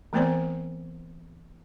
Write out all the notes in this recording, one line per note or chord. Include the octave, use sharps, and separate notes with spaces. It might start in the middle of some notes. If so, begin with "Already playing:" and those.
E3 A3 B3 C4 C5 D5